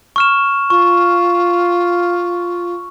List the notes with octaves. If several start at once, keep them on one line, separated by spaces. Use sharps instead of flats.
C#6 F6 E7
F4 C#6